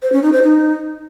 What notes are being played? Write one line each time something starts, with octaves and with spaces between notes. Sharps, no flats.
C5
C#4
D#4
C5
D#4